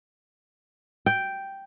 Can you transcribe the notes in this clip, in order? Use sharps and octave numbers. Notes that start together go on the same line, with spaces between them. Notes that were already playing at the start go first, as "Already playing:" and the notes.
G5